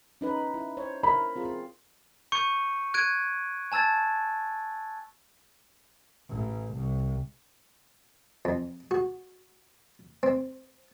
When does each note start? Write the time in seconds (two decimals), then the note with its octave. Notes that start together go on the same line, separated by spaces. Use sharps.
0.21 C#4 D#4 B4
0.54 E4
0.77 C5 C#5
1.03 E4 A#4 B5
1.36 C4 F4 G#4
2.32 C#6 G6 C#7 D#7
2.94 F#6 G#6 D7 D#7
3.72 G#5 A5 E6 G#6 A6
6.30 A1
6.75 C2
8.45 F2
8.91 F#4
10.23 C4